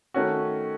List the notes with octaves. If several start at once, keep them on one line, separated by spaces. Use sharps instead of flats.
D#3 A3 C#4 F#4